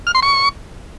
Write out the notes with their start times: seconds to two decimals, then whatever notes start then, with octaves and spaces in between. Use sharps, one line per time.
0.07 F6
0.15 C6
0.23 C#6